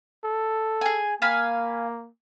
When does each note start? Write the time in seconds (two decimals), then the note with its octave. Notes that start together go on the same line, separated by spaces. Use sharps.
0.25 A4
0.81 G#4 G#5
1.22 A#3 F5 G#5 B5